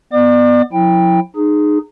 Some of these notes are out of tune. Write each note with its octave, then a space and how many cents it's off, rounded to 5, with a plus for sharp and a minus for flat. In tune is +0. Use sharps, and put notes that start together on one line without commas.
B3 +0 D5 +30 D6 +40
F3 +45 E4 +0 G5 +15
D#4 -30 G#4 +5